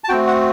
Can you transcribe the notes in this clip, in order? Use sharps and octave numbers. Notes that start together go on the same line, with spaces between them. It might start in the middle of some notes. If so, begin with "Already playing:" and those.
A5
A3 C4 F#4 G5
F#5